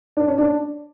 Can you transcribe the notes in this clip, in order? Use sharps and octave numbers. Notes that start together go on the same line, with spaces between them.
D4
C#4
D4